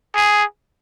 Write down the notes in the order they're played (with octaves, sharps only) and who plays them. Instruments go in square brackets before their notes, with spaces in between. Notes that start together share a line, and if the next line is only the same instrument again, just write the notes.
[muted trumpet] G#4